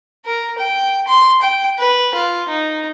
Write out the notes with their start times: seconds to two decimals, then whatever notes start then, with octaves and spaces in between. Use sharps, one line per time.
0.26 A#4
0.59 G5
1.08 C6
1.42 G5
1.79 B4
2.15 F4
2.49 D#4